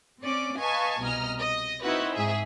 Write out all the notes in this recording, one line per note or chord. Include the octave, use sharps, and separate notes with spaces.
C4 C#4 D5
B4 D#5 F5 G#5 A5 C#6
C2 B2 D#5 A#5 F6
D#5
C4 D#4 E4 F#4 B4
G#2 G#4 E5